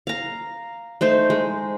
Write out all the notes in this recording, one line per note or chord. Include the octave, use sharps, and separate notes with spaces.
F5 A#5
A3 D#4 C5
G#3